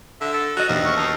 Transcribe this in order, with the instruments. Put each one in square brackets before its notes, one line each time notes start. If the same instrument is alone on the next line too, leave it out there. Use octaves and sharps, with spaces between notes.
[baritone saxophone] D3 [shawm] E5
[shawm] A4
[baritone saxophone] F#4 [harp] D#5 F6
[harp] E1 F6 [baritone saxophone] D#2
[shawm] C#6
[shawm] D#4 [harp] A5 C7